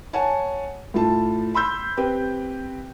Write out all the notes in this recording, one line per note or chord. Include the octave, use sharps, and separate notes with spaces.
C#5 F#5 G#5 A5
A2 F4 A5
B5 C6 E6 G6
C4 G4 B4